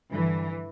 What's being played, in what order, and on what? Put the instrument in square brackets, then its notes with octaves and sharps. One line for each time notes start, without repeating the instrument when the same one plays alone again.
[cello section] G2 D3 E3